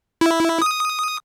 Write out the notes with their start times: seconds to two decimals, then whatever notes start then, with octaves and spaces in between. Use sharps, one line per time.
0.21 E4
0.62 D#6